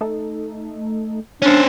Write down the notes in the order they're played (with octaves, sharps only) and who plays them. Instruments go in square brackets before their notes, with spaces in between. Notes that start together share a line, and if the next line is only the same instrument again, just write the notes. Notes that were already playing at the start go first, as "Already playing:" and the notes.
[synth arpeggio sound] A3 D#4 A4
[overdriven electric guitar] C#4 C5 [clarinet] D4 [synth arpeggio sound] C6 F6 C#7